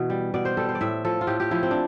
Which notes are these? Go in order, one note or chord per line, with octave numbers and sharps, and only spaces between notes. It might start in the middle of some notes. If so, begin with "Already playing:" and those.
Already playing: B2 E3
G3
B2 D5
C5
G3 A4
C5
D5
A2 E5
F3 A4
F4
A2 G4
G4
F3 E4
C4
D4